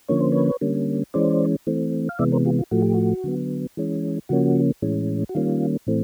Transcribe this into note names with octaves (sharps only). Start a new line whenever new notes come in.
D3 F3 A#3 C#4 C#5
C5
B4 C#5
D3 G3 A#3 C#4
E3 G#3 C#4 C5 D5
E3 A3 C4
F5
C3 E3 G#3 B3 D5 E5
A#4 C5
F4 G4
F4
A2 F3 A3 F#4
G4
F#4
D3 F#3 B3
E3 G#3 C#4
C#3 F3 A#3 C#4 F#4
A2 E3 G#3 C#4
F#4
D#3 G3 A#3 C#4 F4
A2 E3 A3 C4